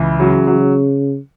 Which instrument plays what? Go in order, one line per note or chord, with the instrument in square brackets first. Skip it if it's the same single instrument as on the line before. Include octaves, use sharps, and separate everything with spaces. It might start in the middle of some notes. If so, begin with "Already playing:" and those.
Already playing: [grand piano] C#2 E3
[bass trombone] C#3 [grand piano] F#3
[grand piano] F#3